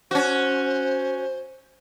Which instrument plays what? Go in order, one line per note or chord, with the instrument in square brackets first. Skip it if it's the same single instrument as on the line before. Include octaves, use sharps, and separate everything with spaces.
[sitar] C#4 F#4 [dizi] C5